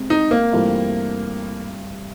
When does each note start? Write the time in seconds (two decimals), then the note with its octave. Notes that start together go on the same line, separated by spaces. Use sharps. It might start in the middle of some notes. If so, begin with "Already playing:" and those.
Already playing: C3 G#3 C4
0.10 D#4
0.31 A#3
0.53 G2 E3 A3 C4 F4